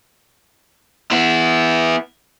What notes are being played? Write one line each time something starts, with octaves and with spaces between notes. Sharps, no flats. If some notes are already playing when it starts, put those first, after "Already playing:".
B3 E4